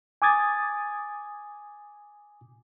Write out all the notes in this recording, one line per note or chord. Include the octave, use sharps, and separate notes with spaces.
G#5 D6 D#6 G#6 A6